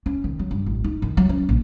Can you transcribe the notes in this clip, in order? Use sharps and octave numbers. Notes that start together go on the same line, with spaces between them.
C#4
D#3
F#3
G2
A1
D#4
D#3
F#3
C#4
A#1